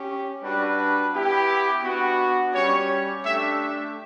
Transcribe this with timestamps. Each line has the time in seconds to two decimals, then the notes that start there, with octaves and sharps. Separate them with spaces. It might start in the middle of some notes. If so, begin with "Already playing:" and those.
Already playing: C#4 G4
0.42 G3 D4 F#4 B4
1.13 B3 E4 G4
1.83 B3 D4 F#4
2.54 G3 C#4 G4 C#5
3.24 A3 D4 G4 E5